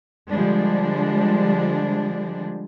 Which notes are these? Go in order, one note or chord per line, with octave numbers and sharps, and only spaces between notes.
D3 F3 G3 G#3 D4